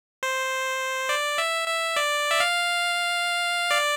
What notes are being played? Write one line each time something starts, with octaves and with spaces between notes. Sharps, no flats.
C5
D5
E5
E5
D5
E5
F5
D5